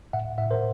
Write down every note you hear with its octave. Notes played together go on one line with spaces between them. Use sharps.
A2 E5 F#5
A2 E5 F#5
A#4 C5